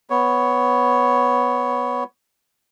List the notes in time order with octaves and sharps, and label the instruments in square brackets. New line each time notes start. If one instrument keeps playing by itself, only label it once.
[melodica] B3 C#5